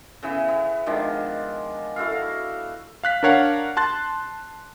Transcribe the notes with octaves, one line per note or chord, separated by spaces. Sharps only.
C#3 E3 B3
B3
D#3 F3 G#3 D4
E4 F#4 A4 F5
F5 F#6 B6
D4 A#4 C#5 F5 F#5
A5 C6 F#6 A6